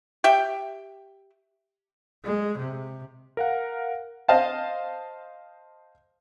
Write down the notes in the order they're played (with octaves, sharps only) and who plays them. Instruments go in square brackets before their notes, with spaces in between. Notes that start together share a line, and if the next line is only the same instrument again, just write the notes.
[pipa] G4 E5 G5
[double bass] G#3
C3
[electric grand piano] A#4 F5 F#5
[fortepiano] C5 D#5 F5 A5